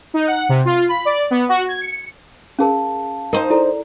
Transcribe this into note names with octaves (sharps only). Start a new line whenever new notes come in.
D#4
F#5
C3
F4
B5
D5
B3
F#4
G#6
C#7
C#4 G#4 A#4 F5 A5
D#4 A#4 C5 G5
E4 A4 D5 A#5